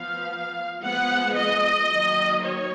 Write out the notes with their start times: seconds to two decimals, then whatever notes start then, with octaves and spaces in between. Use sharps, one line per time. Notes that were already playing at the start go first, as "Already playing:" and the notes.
Already playing: F3 B3 F5
0.82 F3 G#3 B3 F#5
1.35 D#5
1.89 D#3 F#3 A#3
2.42 C#5